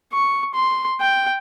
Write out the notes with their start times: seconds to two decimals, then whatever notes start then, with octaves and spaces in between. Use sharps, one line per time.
0.13 C#6
0.54 C6
1.01 G5